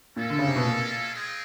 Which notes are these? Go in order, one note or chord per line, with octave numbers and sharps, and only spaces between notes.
A#2 G#3 C#4 E4 A4
D3
C#3
C3
B2
A#2
G#3 C4 F4 G#4